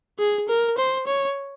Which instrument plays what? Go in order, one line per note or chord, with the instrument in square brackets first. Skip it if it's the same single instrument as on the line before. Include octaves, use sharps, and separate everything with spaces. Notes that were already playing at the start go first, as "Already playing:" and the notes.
[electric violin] G#4
A#4
C5
C#5